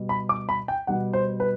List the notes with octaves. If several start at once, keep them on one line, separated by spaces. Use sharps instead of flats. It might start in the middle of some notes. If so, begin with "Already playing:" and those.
Already playing: B2 G3
B5
D6
B5
G5
B2 G3 F#5
C5
B4